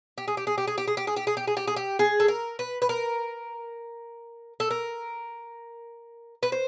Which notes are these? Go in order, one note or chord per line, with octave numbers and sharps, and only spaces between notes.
G4
G#4
G4
G#4
G4
G#4
G4
G#4
G4
G#4
G4
G#4
G4
G#4
G4
G#4
G4
G#4
A4
A#4
B4
B4
A#4
A4
A#4
B4
C5